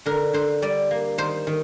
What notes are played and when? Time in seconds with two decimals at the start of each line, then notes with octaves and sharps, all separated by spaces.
0.06 D3 A#4
0.33 D3 C5
0.62 G3 D5
0.91 A#3
1.18 D#3 C5
1.47 D#3